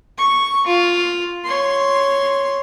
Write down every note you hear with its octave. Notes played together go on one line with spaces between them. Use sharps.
C#6
F4
C#5 C6